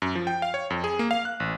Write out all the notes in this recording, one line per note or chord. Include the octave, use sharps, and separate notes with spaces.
F#2
F3
G5
F5
C#5
F2
G#4
A#3
F5
F#6
A1